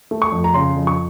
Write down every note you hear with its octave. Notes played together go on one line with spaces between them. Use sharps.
A3
C#6
F2
A#5
C#3 C6
F2
C#6